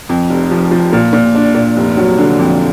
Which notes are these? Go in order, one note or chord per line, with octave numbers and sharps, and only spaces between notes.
F2
F1
F3
F3
A#2
A#2
D4
A#2
F1
F#3
D3
F2